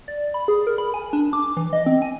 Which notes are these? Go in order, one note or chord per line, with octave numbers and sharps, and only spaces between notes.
D5
B5
G#4
A#4
B5
G#5
D4
D6
E3
D#5
C4
G#5